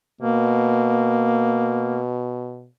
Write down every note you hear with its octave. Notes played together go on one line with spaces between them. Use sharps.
B2 A#3